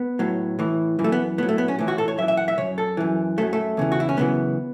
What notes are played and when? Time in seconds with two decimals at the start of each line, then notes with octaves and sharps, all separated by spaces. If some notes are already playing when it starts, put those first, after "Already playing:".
Already playing: B3
0.19 A2 F#3
0.59 A2 E3
0.99 F#2 E3
1.04 A3
1.12 B3
1.38 A2 B3
1.43 F#3
1.49 A3
1.58 B3
1.68 C#4
1.79 A2 E3
1.88 F#4
1.98 A4
2.08 C#5
2.18 F#2 E5
2.22 E3
2.28 E5
2.37 F#5
2.48 E5
2.58 F#2 E3 C#5
2.78 A4
2.97 F#2 E3
3.38 F#2 A3
3.41 F#3
3.53 A3
3.77 E2 C#3 E3
3.92 F#4
4.00 E4
4.09 C#4
4.17 F#2 C#3 E3 B3